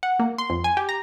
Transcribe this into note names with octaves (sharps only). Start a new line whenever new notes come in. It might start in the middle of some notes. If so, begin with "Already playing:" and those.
F#5
A#3
C6
F2
G#5
G4
A#5